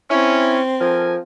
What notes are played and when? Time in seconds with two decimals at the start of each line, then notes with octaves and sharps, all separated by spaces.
0.11 C4 C#4 E4
0.81 F3 A4 A#4 G#5